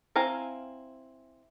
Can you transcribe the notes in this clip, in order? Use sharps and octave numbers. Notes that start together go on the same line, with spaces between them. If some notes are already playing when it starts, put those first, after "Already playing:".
C4 E4 F5 G#5 A#5